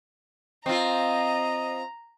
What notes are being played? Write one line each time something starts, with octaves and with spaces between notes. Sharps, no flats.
C4 F4 D#5 A#5